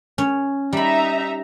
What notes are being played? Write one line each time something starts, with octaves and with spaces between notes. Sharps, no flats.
C#4
G3 D#4 E5 A#5 B5